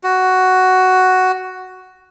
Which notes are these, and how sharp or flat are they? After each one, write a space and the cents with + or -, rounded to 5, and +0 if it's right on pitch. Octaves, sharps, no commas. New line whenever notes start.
F#4 +5